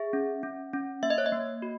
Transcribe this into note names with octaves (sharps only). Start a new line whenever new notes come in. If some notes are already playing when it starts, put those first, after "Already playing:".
Already playing: G#4 E5
C#4
C#4
C#4
A#3 E5
D#5
C#5
D#5
A#3
F#4